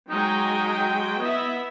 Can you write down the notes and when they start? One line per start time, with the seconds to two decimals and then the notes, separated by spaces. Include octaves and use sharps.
0.10 F#3 G#3 D#4 G5
1.21 B3 E4 D#5 E5